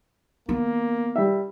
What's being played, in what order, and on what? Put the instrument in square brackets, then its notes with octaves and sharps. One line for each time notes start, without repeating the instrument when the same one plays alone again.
[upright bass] D#3 B3 [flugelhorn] A#3
[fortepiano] G3 E5